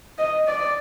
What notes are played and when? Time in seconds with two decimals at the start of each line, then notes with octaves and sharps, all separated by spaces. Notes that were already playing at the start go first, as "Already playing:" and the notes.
0.18 D#5
0.48 D5